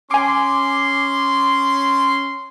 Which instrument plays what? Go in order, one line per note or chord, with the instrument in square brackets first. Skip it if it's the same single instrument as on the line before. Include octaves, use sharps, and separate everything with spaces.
[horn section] C#4 C6 [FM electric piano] G#5 D6